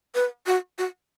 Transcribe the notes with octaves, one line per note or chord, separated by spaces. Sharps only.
B4
F#4
F#4